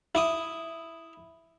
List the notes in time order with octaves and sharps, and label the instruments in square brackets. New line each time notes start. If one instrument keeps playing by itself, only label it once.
[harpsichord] E4 D6 D#6